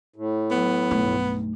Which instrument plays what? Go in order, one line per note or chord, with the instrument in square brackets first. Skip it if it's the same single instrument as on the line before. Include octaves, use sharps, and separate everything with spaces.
[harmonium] A2
[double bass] F#3 [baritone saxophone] B3
[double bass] B1 G2 [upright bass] A3 D#4